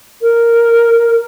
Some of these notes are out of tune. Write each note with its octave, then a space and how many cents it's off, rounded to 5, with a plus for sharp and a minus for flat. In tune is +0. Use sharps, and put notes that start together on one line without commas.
A#4 -5